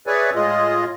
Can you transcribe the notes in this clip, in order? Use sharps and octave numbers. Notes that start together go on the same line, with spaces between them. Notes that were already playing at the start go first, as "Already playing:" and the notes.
G#4 B4 C#5 D5 E5 G#5
A2 G#3 F4 G#4 D#5